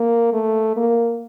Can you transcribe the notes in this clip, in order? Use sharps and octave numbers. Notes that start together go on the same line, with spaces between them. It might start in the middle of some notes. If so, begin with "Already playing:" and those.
Already playing: A#3
A3
A#3